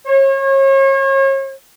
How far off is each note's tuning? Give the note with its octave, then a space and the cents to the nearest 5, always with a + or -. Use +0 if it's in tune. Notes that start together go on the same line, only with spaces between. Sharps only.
C#5 -35